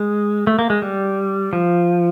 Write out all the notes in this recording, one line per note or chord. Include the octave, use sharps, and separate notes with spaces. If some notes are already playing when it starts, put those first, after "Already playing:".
Already playing: G#3
A3
A#3
G#3
G3
F3